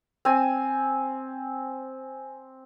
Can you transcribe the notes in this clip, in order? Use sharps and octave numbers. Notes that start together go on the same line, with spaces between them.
C4 G#5